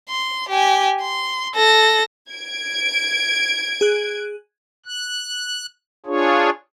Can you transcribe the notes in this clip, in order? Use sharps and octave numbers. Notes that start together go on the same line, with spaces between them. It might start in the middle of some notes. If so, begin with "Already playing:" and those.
C6
G4 G#5
C6
A4 A#6
G#6 D7
G#4 F#6
F#6
D4 F4 G#4 C#5